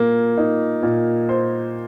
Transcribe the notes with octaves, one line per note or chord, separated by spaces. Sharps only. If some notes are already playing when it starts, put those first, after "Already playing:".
Already playing: A#2 A#3
D#4
A#2
C5